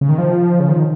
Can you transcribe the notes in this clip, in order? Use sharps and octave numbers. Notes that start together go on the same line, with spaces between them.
C#3
D#3
F3
C#3
D#3